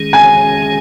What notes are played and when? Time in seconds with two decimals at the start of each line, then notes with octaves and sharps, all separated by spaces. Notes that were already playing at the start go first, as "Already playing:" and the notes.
Already playing: D#3 G#3 C#4 G#4
0.13 G#5